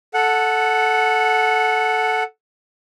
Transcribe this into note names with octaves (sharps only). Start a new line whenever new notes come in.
A4 F#5